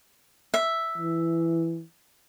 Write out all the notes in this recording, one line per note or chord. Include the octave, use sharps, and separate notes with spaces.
E5
E3